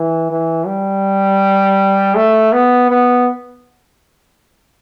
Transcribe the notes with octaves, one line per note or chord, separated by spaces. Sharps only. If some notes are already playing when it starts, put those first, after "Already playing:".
Already playing: E3
E3
G3
A3
B3
B3